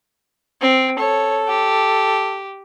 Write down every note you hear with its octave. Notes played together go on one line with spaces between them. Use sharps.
C4
A4 C#5
G4